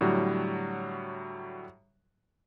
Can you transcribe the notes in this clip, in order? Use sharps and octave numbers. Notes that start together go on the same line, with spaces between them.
A2 D3 F#3 G3